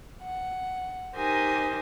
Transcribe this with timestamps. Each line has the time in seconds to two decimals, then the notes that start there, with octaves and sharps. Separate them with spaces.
0.22 F#5
1.16 D#4 G4 A#4 C5 G#5 D#6